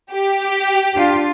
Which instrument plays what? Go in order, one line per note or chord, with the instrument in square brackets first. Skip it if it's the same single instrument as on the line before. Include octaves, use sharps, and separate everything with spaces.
[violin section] G4
[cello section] D4 F4